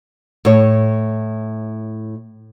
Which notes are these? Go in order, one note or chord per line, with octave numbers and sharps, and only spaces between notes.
A2 C#5